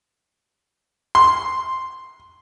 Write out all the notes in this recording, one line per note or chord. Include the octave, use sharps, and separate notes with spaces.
C6